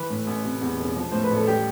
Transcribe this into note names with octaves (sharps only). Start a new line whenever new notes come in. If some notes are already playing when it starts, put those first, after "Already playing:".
Already playing: E3 B4
A2
A1
C3
E2
E1
F3
A2 C5
B4
A1
A4
G3 G4